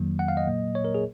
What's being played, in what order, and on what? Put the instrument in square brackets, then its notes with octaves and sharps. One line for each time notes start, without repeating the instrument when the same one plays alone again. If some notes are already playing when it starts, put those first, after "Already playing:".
Already playing: [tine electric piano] F2 D#3 F#3 A#3
F#5
F5
D#5
A#2 F#3 A#3
C#5
A#4
G#4